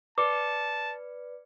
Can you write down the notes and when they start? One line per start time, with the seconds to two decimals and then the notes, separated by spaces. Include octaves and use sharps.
0.18 B4 D5 A5 D6 C#7